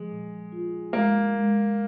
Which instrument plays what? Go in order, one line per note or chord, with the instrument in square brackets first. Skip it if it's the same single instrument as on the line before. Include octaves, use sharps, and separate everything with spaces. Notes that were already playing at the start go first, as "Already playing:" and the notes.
Already playing: [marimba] F3 [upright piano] G#3
[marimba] A#2
F4
[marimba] G#3 [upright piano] A#3
[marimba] G#3